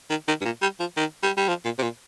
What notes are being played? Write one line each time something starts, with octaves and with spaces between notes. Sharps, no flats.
D#3
D#3
G2
A#2
G3
F3
D#3
G3
G3
F3
A#2
C3
A#2